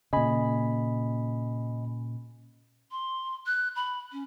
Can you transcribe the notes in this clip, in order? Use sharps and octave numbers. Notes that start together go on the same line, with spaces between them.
A#2 C#3 D#5 G#5 B5
C6
F#6
B5
C#4